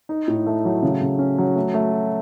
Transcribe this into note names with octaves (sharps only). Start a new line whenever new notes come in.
D#4
A2
A3
F#3
C#3
C#3
C#4
F#3
A3
A3
F#4